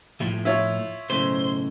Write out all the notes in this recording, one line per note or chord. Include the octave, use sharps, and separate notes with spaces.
A2 F3
E4 F4 C#5
B1 A2 C#3 C5